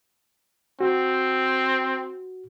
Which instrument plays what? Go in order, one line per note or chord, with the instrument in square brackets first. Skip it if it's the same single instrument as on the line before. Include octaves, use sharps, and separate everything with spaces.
[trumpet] C4 [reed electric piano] F#4